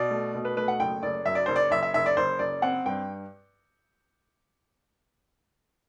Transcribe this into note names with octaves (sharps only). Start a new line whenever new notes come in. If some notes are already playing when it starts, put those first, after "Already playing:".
Already playing: B2 D5
A3
B2
B4
A3 B4
F#5
F#1 G5
F#1 D5
F#2 E5
D5
F#1 C5
D5
F#1 E5
E5
F#1 E5
D5
F#1 C5
F#1 D5
C4 F#5
G2 G5